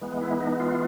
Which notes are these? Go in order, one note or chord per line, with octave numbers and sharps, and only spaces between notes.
E3 G#3 B3
E4
D#4
F4